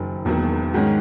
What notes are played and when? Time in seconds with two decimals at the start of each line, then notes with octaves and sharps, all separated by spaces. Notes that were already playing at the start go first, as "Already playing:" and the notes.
Already playing: F#1 F#2 D#3
0.25 E1 E2 D#3 F#3 A#3
0.73 G#2 D#3 G#3 C#4 F#4